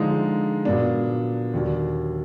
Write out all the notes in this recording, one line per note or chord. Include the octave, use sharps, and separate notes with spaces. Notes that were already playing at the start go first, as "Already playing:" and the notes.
Already playing: D3 F3 G#3 D#4
A#2 F#3 B3 D4
D#2 D3 F#3 D4